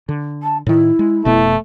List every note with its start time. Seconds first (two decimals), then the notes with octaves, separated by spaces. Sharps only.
0.09 D3
0.42 A5
0.66 A2 D#3 E4
0.99 G#3
1.25 F1 B2 A3 B3